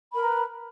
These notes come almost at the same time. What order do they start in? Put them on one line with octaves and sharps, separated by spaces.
B5 A#4 A#5 B4